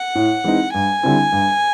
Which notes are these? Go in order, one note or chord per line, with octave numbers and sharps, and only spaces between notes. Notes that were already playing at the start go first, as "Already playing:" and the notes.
Already playing: F#5
A2
E3 G#3 C4 D#4
G2 G#5
D3 G3 C4 E4
G2